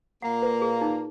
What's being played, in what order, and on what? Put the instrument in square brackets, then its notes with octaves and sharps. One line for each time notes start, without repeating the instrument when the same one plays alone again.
[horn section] A#2 A#3 [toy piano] F#5
[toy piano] B4
G#4
D#4